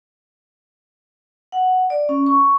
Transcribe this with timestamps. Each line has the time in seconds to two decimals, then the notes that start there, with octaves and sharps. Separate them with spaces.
1.52 F#5
1.90 D5
2.09 C#4
2.26 C#6